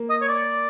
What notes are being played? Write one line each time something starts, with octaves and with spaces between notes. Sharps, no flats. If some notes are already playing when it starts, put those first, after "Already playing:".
Already playing: A#3
D#5
C#5
D5